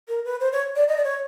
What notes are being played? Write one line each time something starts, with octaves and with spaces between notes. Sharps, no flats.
A#4
B4
C5
C#5
D5
D#5
D5
C#5